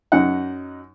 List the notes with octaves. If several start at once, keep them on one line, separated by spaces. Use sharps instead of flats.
F#2 D#4 F#5